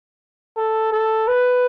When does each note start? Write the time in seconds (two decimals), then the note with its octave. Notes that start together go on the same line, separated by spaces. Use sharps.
0.57 A4
0.92 A4
1.27 B4